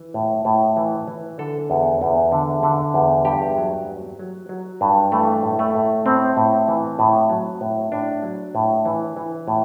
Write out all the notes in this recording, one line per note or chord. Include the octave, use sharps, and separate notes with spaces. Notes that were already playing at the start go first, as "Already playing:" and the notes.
Already playing: E3
A2
A2
E3
E3
D3 A4
E2
E2
D3
D3
E2
G2 G4
F#3
F#3
F#3
F#3
G2
E3 A3
A2
A3
A2
A2 C4
A2
E3
A2
F#3
A2
A2 D4
F#3
A2
E3
E3
A2